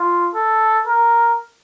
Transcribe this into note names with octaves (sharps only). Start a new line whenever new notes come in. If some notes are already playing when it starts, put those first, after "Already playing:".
Already playing: F4
A4
A#4